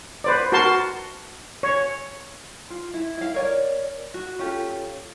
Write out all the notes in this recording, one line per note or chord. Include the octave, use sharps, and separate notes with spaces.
B4 C5 D5
F#4 A#4 A5 C6
C#5
F4
E4
E4 F5
A#4 C#5 D5
F#4
C#4 F4 G4 A4